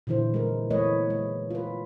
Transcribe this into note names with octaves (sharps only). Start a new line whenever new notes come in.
A#2 D3 E3 E4 C5
G#3 A#4
E3 A3 A#3 B4 C#5 D#5
G#3
F4 B4